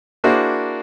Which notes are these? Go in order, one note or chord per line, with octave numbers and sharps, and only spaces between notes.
A#3 D4 E4 F#4 G#4 C5